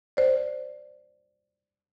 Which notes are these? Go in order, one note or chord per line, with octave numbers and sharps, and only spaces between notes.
C5 D5